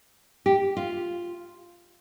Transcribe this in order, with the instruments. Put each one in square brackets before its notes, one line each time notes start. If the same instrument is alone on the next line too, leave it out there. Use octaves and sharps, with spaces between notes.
[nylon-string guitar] G4
F4